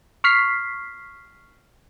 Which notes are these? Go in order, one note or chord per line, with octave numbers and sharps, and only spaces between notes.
C#6 F6 B6 C7